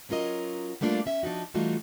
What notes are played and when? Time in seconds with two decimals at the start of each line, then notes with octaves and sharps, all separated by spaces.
0.09 F#3 C#4 F4 A#4 D#5
0.81 G3 A3 A#3 D4 F4
1.06 C#4 E5
1.23 F3 D4 D#4 F#4
1.54 E3 G3 A3 D#4 F4 F#4